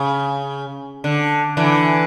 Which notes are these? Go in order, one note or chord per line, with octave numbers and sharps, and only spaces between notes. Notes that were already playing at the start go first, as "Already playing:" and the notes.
Already playing: C#3
D3
D3 E3